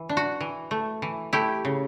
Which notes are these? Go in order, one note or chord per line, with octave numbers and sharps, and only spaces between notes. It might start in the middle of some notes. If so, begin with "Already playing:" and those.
Already playing: E3
D4
F#4
E3
A3
E3
A3 E4 G4
C#3